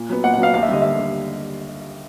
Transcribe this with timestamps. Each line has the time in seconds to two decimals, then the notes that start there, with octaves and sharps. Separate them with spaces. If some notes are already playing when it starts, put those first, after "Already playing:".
Already playing: A#2
0.09 F#3 B3
0.23 A#2 F#5
0.34 F#5
0.38 F#3 B3 F5
0.54 D#2 F5
0.63 E5
0.69 D3 G3 D#5
0.82 D#2 E5
0.99 D3